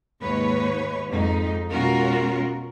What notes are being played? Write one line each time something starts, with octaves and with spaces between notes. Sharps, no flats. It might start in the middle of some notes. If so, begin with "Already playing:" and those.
D#2 G#2 B4 C#5
F2 G#2 D#4
B2 G#3 C#4 F4 F#4 A#4